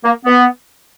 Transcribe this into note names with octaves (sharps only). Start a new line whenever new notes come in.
A#3
B3